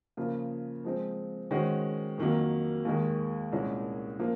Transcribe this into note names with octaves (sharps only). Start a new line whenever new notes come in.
C#3 F3 A#3 F4
F3 G#3 C4
D#3 G#3 C#4 F#4 C5
F2 D#3 F#3 A#3
D#2 D#3 G#3
C2 A#2 G#3 C#4
F3 A#3 F4